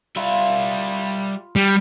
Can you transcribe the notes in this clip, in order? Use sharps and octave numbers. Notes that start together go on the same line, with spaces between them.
G3 F4 E5 B5
G3